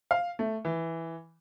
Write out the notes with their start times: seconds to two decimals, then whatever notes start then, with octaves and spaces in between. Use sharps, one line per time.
0.11 F5
0.39 A3
0.65 E3